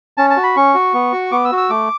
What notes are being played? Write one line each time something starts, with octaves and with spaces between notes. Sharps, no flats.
C#4 A5
A5
F#4
B5
C#4 C#6
F#4
B3
F#4
B3 D6
E6
F#4
E6
A3 D6